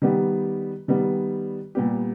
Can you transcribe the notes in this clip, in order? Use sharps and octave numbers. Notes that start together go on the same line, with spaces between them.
D#3 G3 B3 G4
D#3 G3 B3
A#2 G3 B3 G4